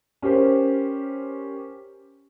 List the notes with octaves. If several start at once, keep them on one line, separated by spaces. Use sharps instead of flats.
C#4 G4 A#4 C5